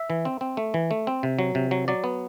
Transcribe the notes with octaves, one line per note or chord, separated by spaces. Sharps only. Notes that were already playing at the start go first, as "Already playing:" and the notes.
Already playing: E5
E3
C4
C4
A3
E3
A3
C4
C3
F#3
C3
F#3
F#3 D5
B3